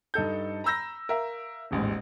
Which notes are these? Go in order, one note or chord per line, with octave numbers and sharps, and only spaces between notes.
G2 D#4 A4 G6
A#5 B5 E6 G6 A#6
A#4 E5 F5
D#1 A1 G#2